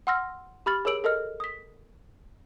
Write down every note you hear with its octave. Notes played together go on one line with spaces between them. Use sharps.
F#5 C6 E6 F6 A#6
G4 B5 F6 A6 F#7
G#4 A#4 C#5 E6 D7 F#7
A4 A#4 D#5 F6
D#6 B6